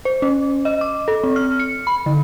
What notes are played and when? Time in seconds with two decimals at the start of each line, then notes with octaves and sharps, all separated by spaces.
0.05 C5
0.22 C#4
0.65 D#5
0.81 D6
1.08 A4
1.24 C4
1.36 F6
1.60 C#7
1.87 B5
2.06 D3